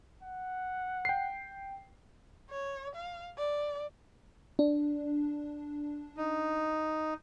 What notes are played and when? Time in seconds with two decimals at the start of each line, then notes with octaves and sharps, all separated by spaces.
0.23 F#5
1.05 G5 C7
2.50 C#5
2.96 F5
3.38 D5
4.59 D4
6.17 D#4